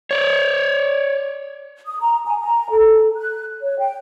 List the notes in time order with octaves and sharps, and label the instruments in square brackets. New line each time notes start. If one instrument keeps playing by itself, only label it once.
[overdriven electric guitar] C#5 D5
[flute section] D#6
A#5
G#5
A#5
A4
F#6
C#5
G5